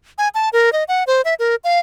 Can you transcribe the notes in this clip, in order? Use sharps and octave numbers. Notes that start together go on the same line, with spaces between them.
G#5
A5
A#4
D#5
F#5
C5
E5
A#4
F5